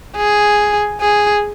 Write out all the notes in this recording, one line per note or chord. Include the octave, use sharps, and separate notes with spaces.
G#4
G#4